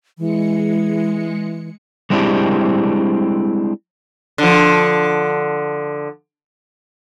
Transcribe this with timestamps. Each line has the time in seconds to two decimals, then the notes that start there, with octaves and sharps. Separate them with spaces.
0.18 E3 G#3 C#7
2.10 G3 G#3 C4 D4 E4 G4
4.38 D3 F3